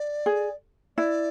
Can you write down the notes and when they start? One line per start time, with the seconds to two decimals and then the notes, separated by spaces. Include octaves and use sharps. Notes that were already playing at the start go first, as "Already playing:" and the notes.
Already playing: D5
0.26 G#4
0.97 E4 D5